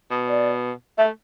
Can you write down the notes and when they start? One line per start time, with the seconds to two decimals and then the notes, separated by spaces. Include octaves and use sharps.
0.11 B2
0.28 D5
0.98 A3 E5